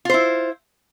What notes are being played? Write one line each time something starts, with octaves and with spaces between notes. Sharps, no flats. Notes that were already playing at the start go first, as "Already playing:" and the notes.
E4 F4 C5